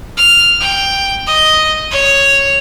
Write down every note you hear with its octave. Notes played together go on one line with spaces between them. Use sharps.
F6
G5
D#5
C#5